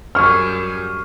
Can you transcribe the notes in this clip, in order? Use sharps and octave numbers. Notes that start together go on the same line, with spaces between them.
F#2 G3 G#4 C#6 F6